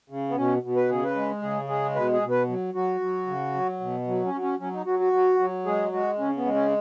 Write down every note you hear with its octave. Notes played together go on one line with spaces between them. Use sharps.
C#3
B3
B2 C#4
B2
B4
C#3 G#4
B4
G#3
C#3 G#4
G#3 G#4
B2 B4
G#4
B2
B4
F#3
F#3 F#4
F#3
C#3
F#3
B2
F#3
C#4
F#3
C#4
F#3 C#4
D#4
F#3 F#4
F#4
F#3
F#3
G#3 G#4
G#3 F#4
C#3 C#4
B3
G#3
C#4